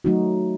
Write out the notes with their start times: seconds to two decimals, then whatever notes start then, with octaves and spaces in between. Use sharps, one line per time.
0.05 F#3 A3 D#4 F#4